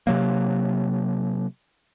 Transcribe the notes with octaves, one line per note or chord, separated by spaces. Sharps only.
C3 F#3 A#3